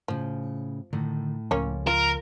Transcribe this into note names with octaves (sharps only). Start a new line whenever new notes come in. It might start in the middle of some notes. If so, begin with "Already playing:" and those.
A2 C#3 F3
A2 D3 D#3
C#2 F3 A#3 C#4 C#5
F4 A#4